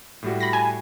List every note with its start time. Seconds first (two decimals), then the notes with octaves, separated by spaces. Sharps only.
0.23 A2 G3 F#4
0.40 B5 A#6
0.53 G#5